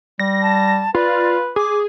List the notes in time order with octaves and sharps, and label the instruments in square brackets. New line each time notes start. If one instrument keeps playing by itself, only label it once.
[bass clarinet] G3 [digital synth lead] A#6
[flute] A5
[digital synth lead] F4 [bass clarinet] B4 [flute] D5
[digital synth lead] G#4 [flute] D6